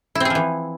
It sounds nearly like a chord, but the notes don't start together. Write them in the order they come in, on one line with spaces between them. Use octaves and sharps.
E4 C4 G#4 F3 E3